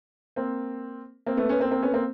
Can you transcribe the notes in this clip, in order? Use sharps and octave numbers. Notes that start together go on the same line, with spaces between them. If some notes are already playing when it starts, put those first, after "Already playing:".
A#3 C4
A#3 C4
A3 B3
B3 C#4
A#3 C4
A#3 C4
B3 C#4
A#3 C4